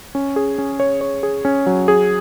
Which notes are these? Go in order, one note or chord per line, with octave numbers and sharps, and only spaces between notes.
C#4
G#4
C#4
C#5
C#5
G#4
C#4
F#3
G#4